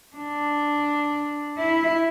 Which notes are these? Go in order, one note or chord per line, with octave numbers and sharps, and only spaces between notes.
D4
E4